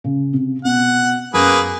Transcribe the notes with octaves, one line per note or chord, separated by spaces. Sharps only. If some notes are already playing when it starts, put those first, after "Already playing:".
C#3
C3
B2 F#5
F#2 A#3 G#4 B4